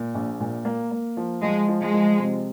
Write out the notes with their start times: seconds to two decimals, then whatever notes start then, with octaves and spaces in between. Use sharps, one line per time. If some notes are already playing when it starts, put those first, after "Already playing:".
Already playing: A#2
0.15 A#1
0.40 A#2
0.65 A#3
0.91 A#3
1.17 F3
1.42 F3 G#3
1.68 F3
1.81 G#3
1.94 F3
2.19 C3